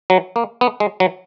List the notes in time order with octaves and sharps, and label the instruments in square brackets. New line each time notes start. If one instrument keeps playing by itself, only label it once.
[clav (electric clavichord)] F#3
A#3
B3
G#3
F#3